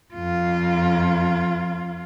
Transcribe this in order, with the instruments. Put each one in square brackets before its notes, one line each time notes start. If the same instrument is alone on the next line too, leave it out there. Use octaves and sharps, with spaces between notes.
[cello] F2 F4